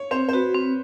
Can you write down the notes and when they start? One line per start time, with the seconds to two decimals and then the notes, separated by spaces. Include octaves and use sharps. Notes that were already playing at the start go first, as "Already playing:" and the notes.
Already playing: C#5
0.11 C4 C5
0.29 C5
0.33 F#4 B4
0.54 C4